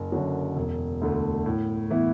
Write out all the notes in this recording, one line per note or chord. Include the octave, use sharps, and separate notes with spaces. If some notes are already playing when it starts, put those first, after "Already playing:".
Already playing: F#1
F#2 D3 F#3
E1
D2 D3 A3
A2
E3 B3 E4